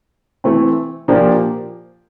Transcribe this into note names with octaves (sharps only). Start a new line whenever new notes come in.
E3 A3 C4
A#2 F3 A#3 D4 G4